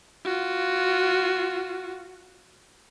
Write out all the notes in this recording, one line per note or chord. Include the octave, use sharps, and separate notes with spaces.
F4 F#4